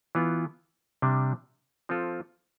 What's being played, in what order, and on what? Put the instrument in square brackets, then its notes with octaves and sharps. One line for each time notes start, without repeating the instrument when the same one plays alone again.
[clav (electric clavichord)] E3 B3 F4
C3 G3 D4
F3 C4 F4 A4